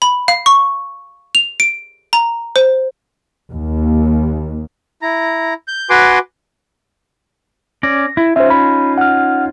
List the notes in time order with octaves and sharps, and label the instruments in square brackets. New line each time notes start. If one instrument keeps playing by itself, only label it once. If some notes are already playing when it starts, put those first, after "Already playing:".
[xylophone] B5
F5
C#6
F7
D7
A#5
C5
[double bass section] D#2
[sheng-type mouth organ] E4 A#5
G6
F#4 B4 G#5 C6 D6
[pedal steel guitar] C#4 D5 [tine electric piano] A#6
[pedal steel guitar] E4
[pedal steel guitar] C#4 D#4 F4 [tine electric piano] C5 E5
[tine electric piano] B5
F#5 F6